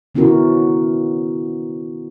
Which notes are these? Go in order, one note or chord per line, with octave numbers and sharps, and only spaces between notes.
D#3 B3 C#4 E4 F#4 A#4